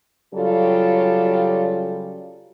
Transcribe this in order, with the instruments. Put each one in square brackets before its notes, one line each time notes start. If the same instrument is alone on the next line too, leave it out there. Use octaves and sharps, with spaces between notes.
[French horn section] C#3 F#3 G3 F4 G4 A4